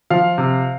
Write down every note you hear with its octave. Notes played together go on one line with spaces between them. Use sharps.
F3 F5
C3